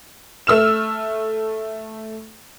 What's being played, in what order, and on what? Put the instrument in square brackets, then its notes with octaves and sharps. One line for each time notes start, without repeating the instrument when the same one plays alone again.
[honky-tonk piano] A3 E6 F6 E7